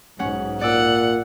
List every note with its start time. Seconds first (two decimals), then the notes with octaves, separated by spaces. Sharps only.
0.19 B1 G#2 C#4 F#5
0.61 A#2 D5 F#5 E6